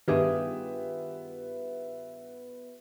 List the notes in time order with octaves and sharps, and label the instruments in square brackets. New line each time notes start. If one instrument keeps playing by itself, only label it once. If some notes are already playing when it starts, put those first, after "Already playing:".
[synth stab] G2 D#3 [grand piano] B3 E5 [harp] F4 G4 G#4